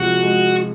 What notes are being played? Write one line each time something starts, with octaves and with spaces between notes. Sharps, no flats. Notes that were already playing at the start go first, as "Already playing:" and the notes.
Already playing: C3 F3 G#3 F#4
G#3